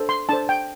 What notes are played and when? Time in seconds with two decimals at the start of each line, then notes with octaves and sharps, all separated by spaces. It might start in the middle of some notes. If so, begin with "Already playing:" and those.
Already playing: D4 A4 C5
0.09 C6
0.29 D4 A4 C5 A5
0.49 G5